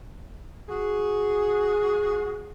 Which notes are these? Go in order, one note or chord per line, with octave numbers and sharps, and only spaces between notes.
F#4 G#4